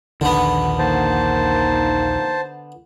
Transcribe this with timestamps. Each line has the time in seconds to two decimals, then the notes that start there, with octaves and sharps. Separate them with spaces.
0.21 A#1 D#2 D3 D#3 B3
0.79 A#3 D#4 C5 A5